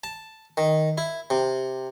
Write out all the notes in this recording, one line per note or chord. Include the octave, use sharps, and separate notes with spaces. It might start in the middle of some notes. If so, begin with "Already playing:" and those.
A5
D#3
E4
C3